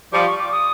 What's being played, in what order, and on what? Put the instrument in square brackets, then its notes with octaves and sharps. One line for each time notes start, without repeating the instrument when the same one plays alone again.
[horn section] F3 G3 [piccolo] D6
[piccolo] C#6
D6
D#6